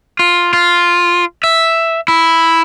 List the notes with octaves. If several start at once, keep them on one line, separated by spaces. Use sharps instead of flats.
F4
F4
E5
E4